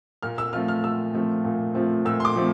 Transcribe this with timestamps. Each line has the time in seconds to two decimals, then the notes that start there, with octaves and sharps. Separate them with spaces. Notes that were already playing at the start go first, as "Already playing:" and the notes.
0.23 A#2 F6
0.38 E6
0.53 F3 A3 C4 F4 F6
0.68 F6
0.83 A#2 E6
1.14 F3 A3 C4 F4
1.44 A#2
1.75 F3 A3 C4 F4
2.05 A#2 E6
2.20 C6
2.25 D6
2.36 F3 A3 C4